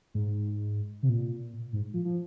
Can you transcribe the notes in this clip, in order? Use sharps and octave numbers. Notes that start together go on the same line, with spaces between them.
G#2
C3
A#2
G#2
F3
F3